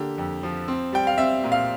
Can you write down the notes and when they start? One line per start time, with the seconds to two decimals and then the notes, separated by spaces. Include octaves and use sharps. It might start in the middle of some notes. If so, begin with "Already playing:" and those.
Already playing: D3 A#3 G4
0.18 F2
0.43 F3
0.68 C4
0.93 G3 G5
1.07 F5
1.18 C4 E5
1.44 A#2
1.52 F5